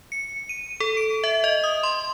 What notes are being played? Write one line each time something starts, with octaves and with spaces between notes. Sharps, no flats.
C#7
D#7
A4
D7
E5
D#5
D#6
C6